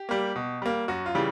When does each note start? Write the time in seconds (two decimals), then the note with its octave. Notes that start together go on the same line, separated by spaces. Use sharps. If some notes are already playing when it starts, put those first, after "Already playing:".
Already playing: G4
0.09 G3 A#3
0.36 B2
0.62 G3 A#3
0.88 F#2 F#4
1.06 F4
1.15 C#3 E3 G3